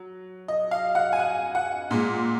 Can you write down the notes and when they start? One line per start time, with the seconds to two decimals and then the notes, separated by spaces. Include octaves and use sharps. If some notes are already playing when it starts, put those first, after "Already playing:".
Already playing: F#3
0.48 D#5
0.71 F5
0.95 F#5
1.13 G#5
1.19 F#5
1.55 F#5
1.91 A#2 G#3